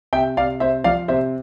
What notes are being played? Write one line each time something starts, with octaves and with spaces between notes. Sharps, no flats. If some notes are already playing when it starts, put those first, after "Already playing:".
C3 E5 G5
C3 D5 F5
C3 C5 E5
F3 D5 F5
C3 C5 E5